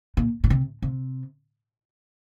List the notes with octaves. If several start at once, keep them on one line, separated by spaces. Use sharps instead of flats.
A#2
A#2
C3
C3